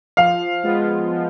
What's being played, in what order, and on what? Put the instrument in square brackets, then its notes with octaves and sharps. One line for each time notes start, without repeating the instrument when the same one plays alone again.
[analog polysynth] F3 [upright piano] F5
[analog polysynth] G#3 B3 F4
F3